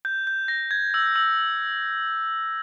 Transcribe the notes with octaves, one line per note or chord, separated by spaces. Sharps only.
G6
G6
A#6
G#6
E6
E6